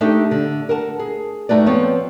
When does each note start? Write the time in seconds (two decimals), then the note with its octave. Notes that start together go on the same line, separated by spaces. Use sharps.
0.01 A3 D4 D#4 G4 A4
0.31 D3
0.69 A#4 F#5 A5
0.99 G#4
1.49 G2 A3 D#4 F#4 B4 D5
1.66 F3 B3 C4 C#5